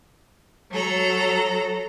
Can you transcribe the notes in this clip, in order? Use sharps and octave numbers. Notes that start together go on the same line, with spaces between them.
F#3 A4 A#5